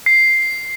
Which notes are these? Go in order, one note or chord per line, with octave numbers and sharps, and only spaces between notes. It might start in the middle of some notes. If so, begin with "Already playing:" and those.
C7